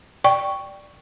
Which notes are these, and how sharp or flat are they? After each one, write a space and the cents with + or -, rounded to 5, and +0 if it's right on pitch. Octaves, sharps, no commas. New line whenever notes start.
D5 +0 G5 +0 C#6 +0